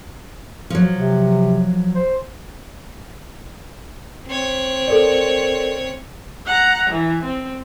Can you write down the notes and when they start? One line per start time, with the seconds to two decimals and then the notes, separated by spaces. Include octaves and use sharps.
0.70 F3 F#3
0.95 C3
1.95 C5
4.27 C4 C#5
4.88 A4 A#4 D5
6.46 F#5 A#5
6.90 E3
7.24 C4